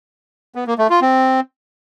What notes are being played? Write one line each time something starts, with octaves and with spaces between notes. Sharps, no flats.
B3
A#3
A3
F4
C4